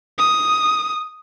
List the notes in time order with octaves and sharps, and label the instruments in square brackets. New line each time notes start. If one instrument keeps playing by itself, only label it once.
[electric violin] D#6